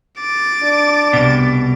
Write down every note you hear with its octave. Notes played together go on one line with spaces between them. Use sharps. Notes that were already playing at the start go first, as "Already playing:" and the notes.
D6 A6
D4
C2 B2